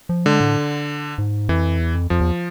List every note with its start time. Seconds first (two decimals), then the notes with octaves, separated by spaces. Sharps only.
0.09 F3
0.25 D3 G#3
0.40 A2
1.18 G#2
1.49 F2 E3
1.79 E2
1.95 F2
2.10 F2 F3
2.21 E2